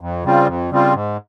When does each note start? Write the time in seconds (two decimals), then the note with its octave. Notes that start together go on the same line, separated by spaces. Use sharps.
0.01 F2
0.24 C#3 G3 C4 F4
0.47 F2
0.71 C#3 G3 C4 F4
0.94 G#2